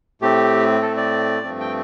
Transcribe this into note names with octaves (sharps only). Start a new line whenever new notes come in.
A2 A3 C4 G4
A4
D5
G2 F3 A3 C4
G5